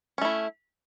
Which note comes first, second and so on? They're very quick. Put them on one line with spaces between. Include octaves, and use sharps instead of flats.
C#4 A3 E4